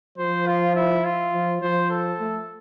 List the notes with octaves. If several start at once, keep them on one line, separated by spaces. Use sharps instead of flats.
F3 C5
F4
E4
F4
F3
F3 C5
A4
A3